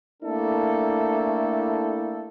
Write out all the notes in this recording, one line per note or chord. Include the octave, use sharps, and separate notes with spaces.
A3 A#3 D4 E4 G4 A4